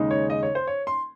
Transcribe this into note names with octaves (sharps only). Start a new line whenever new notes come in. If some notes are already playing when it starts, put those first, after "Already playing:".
Already playing: D#2 C#3 G#3 D#4
C#5
D#5
C#5
C5
C#5
C6